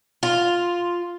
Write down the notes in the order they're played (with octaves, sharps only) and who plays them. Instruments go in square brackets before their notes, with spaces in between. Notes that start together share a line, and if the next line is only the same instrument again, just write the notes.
[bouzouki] F4